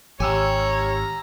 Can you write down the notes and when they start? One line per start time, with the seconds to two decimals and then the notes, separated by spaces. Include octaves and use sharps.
0.20 G#1 G4 C#5 G#5 A#5 E6 F6